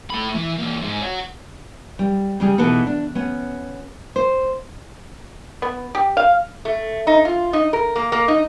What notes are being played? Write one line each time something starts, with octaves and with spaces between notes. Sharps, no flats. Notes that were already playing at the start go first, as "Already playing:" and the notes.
A3 B5
E3
E3 A#3
G#2
C#5 F#5
G3
C#3 G3 G#4
B2 E3 B3 D#4 A4
D4
B3 C#4
C5
B3
G4
F5
A3
D#4
F4
D#4
A#4
A#3
A#3
D#4